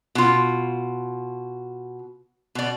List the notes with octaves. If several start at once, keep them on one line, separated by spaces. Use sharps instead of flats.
B2 F4
B2 D5